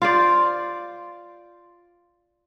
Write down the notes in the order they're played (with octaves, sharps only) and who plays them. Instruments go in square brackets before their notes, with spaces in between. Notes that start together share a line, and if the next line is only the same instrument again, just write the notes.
[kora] F4 C5 D5